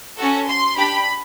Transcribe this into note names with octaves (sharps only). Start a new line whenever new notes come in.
C#4 F#4 A4
C6
D4 G4 B5